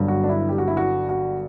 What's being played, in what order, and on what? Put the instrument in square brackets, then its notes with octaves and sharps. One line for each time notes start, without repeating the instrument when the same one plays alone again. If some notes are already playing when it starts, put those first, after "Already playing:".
Already playing: [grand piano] G1 G2 F#3
F#4
D4
E4
G4
F#4
E4
F#4
F#4